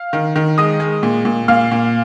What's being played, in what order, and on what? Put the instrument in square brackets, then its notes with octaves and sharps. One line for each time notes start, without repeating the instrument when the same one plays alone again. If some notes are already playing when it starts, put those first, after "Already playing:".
Already playing: [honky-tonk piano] F5 F6
D#3
D#3
G#3 D#5 D#6
G#3
A#2
A#2
A#2 F5 F6
A#2